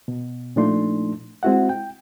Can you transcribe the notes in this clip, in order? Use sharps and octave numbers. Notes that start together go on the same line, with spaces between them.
B2
A#2 F3 A3 D4 D#4 C6
G#3 C4 E4 F#4 E5 F#5
G5